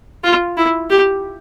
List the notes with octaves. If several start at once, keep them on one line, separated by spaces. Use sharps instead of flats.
F4
E4
G4